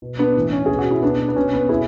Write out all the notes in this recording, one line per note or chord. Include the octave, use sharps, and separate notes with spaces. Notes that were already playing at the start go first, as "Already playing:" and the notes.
B2
B3 D4
A2 E3
C#4
B2 G#4
F#4
E4
B2 B3 D4
B3
B2 C#4
B3
B2 E4 G#4